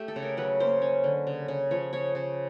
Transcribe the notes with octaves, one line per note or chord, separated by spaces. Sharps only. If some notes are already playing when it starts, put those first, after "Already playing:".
Already playing: A3 G4
A4
C#3
A#4
F#3 B4
A#3 C5
C#4
D3
C#3
C#3
F3 C#5
C#3 C#5
C#3 C5